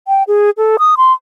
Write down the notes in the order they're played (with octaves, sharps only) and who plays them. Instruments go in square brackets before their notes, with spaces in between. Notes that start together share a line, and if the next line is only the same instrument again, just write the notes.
[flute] G5
G#4
A4
D#6
C6